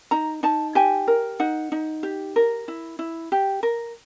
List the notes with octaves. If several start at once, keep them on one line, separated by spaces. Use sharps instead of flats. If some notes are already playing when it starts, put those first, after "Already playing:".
D#4 A#5
D#4 A5
G4 G#5
A#4
D#4 F#5
D#4
G4
A#4
E4
E4
G4
A#4